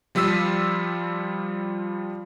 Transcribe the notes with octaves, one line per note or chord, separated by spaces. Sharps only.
F3 G3 F4 E6 B6 D#7